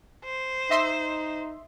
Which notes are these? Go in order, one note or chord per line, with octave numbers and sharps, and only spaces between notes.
C5
D#4 D#5 E5 C6